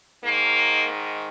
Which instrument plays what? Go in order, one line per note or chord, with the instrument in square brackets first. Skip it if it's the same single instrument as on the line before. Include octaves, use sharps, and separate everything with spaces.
[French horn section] G#2 D#3 A#3